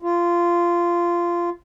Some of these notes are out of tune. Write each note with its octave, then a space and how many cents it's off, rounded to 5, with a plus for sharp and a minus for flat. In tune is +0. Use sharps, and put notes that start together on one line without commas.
F4 -15